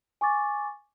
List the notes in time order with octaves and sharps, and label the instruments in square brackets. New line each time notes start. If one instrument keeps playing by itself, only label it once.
[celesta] G#5 C#6 D6 A6